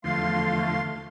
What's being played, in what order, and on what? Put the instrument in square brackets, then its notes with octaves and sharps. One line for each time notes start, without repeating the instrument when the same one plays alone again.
[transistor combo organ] E2 D3 F3 [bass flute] A3 [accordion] F5 C6